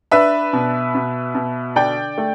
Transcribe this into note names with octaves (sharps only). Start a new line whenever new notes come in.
D4 B4 E5
B2
B2
B2
D3 D5 G5
A3